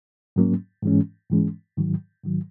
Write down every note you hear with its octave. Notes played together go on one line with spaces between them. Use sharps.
G#2 F#3 A#3 C#4
G#2 E3 G#3 C#4
G#2 E3 G#3 C#4
G#2 D#3 F#3
G#2 D#3 F#3